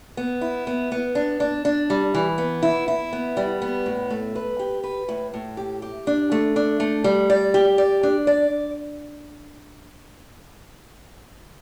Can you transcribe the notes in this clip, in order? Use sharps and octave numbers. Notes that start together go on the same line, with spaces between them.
B3
E4
B3
B3
D4
D4
D4
G3
E3
B3
E4
E4
B3
G3
B3
A2
A3
B4
G4
B4
A2
A2
G4
G4
D4
A3
D4
A3
G3
D5
G4
D5
D4
D5